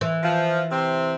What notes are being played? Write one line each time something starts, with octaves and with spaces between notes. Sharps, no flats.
E3
F3
C3 C4